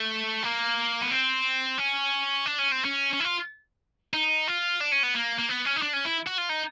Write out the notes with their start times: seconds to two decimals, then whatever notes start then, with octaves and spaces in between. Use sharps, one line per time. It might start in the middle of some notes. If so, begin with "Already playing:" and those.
Already playing: A3
0.44 A#3
1.02 B3
1.11 C4
1.78 C#4
2.46 D4
2.58 C#4
2.72 C4
2.85 C#4
3.13 C#4
3.20 E4
3.24 F4
4.14 D#4
4.48 F4
4.81 D4
4.92 C#4
5.03 B3
5.15 A#3
5.39 A#3
5.49 B3
5.65 C#4
5.76 D#4
5.82 D4
5.93 C#4
6.05 E4
6.27 F#4
6.38 F4
6.49 D#4